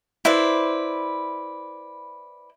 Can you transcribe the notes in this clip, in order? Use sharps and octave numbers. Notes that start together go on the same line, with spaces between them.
E4 B4 C5 D5